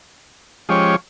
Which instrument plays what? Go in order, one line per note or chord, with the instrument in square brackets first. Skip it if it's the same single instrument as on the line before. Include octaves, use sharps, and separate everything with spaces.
[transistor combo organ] F3 G#3 C#4 G4 C#5